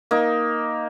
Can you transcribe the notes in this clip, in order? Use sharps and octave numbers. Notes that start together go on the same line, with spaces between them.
A#3 D#4